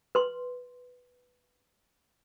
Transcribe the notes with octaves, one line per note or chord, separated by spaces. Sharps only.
B4 C6